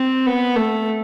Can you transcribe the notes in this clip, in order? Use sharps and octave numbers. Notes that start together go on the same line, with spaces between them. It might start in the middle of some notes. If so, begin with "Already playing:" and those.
Already playing: C4
B3
A3